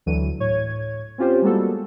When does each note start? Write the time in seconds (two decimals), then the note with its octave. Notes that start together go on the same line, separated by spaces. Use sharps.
0.06 D2 D3 E3 F#3 D#7
0.40 A2 C#5 G#6
1.18 C4 C#4 F4 G4 C5
1.42 G3 G#3 A#3 B3 F#4 A4